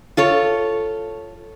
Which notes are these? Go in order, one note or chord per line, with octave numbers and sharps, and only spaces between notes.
F4 A4 C#5